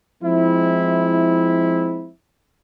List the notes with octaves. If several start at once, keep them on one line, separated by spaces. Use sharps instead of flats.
F3 G#3 C4 E4